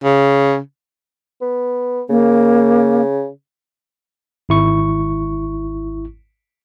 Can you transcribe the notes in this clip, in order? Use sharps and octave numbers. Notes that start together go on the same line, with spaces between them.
C#3
B3
C#3 A#3
G#1 E4 C#6